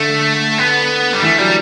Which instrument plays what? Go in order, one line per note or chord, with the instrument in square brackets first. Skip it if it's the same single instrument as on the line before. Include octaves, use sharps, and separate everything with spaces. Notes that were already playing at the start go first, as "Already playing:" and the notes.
Already playing: [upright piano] D3 [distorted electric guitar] A3
[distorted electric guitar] B3
G3
[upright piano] E3 [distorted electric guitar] A3
[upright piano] F#3 [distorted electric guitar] G3